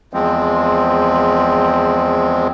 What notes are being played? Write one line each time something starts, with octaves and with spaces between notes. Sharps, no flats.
E2 F3 G#3 C4